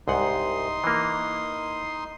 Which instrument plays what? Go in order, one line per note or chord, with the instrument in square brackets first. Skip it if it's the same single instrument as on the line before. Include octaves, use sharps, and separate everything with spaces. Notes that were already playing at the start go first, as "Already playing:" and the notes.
[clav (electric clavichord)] C2 G#2 F#5 [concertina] D#4 C6 D#6
[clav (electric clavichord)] E3 A#3